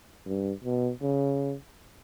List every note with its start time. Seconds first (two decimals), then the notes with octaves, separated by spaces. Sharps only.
0.26 G2
0.64 B2
1.02 C#3